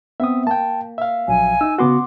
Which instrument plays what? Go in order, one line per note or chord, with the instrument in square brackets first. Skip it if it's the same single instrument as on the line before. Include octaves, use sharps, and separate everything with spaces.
[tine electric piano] B3 C4 [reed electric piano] E5 D#6
[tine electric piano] A#3 [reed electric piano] G5 A5
[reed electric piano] E5 F5
[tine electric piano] A#1 F#3 [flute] G#5
[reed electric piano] D#4 [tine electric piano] E6
[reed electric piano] C#3 B3 F#4 [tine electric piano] F#5 C6 D6